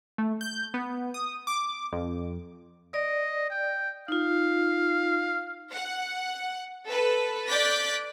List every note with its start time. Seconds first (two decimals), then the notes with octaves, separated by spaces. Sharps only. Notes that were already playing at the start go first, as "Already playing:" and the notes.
0.18 A3
0.41 G6
0.74 B3
1.14 D#6
1.47 D6
1.93 F2
2.94 D5 D#5
3.50 G5
4.08 D#4 F4 F5
5.73 F#5
6.88 A4 B4
7.48 D5 D6 F#6 G6 A6 B6